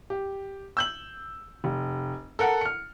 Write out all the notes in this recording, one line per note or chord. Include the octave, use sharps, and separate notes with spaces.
G4
E6 G6 F#7
F1
A4 A#4 F#5
F6 C#7